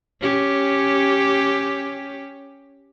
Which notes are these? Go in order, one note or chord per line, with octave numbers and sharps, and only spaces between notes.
C#4 G4